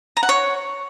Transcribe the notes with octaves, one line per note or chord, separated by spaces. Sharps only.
A#5
F#5
C#5